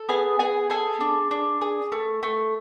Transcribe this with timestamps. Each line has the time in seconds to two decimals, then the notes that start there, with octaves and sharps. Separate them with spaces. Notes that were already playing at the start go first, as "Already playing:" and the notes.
Already playing: A4
0.09 B3 G#4 G#5
0.39 B3 G#4 G#5
0.70 G#4 A4 G#5
1.01 D4
1.31 D4
1.61 G#4
1.92 A3
2.23 A3